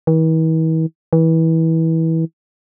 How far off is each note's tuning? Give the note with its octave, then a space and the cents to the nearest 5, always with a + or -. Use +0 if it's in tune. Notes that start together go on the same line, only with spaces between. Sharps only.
E3 -45
E3 -25